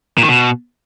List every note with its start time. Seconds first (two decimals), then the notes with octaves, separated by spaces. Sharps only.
0.18 A#2
0.23 D#3
0.29 B2